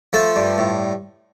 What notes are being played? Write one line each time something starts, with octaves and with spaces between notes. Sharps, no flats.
F3 A3 A4
G2
A2